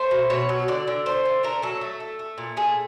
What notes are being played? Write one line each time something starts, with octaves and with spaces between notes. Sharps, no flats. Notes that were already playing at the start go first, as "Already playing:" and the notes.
Already playing: A3 C5
B2
B2 C#5
F#3
D3 D5
D3
A3 C5
D3
A3 A#4
F#3 A4
A3
A3
A3
A#2
A3 G#4